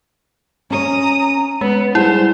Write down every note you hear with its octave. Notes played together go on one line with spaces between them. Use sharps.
C#4 A#4 C#5 A#5 D#6
G#3 B3 B4
G3 E4 G#4 C5 F#5